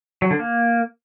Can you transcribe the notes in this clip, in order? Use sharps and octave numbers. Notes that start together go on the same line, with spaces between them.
F#3
D3
A#3